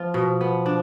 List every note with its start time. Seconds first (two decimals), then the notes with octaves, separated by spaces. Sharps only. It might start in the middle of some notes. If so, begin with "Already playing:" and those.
Already playing: F3 B3 F4
0.14 B2
0.41 B3
0.66 D4